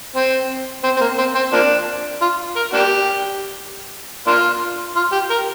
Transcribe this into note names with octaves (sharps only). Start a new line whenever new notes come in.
C4
C4
C4
A#3
C4
C4
F3 A#3 D4
F4
A#4
A#3 D4 G4
A#3 D4 F4
F4
G4
A#4